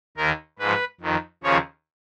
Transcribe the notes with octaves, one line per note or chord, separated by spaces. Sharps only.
D#2 D#3 A#4
G#2 F3 B4
F2 D#3
D#2 C#3 F3 C#5